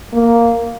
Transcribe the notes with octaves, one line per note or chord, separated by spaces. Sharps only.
A#3